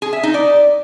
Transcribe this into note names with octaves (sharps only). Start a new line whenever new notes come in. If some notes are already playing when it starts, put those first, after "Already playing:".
G#4
E5
D#4
D5